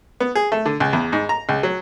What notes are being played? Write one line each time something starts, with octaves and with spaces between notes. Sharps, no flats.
B3
G#4
A3
D3
C#2
E2
G#2
A#5
C#2
F#3